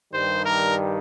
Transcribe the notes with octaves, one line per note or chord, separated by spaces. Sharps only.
G2 D#3 G3 C5
A#4